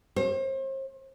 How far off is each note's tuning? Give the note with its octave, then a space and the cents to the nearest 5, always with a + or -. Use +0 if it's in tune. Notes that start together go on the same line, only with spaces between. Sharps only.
C5 +40